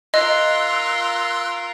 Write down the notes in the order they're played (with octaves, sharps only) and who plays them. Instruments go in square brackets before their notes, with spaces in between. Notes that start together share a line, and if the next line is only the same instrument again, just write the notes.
[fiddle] F4 A#4 [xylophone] D#5 [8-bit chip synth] C6 E6 F#6